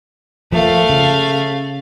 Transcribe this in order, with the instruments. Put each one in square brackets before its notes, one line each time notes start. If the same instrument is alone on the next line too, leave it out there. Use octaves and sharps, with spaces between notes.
[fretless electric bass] F3 A#3 [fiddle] A3 F5
[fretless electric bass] C#3